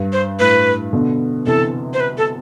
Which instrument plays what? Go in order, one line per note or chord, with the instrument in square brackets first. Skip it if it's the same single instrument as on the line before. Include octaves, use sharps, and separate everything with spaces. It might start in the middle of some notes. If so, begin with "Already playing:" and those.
Already playing: [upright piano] G2
[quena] C5
[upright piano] A2 [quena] B4
[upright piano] B2 D3
[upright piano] C3 E3 [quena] A4
[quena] C5
B4
A4